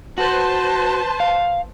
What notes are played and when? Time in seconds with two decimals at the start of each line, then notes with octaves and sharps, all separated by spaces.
0.18 F#4 B4 C5 A5
1.20 F5